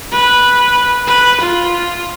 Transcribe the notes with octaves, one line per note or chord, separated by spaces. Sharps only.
B4
B4
F4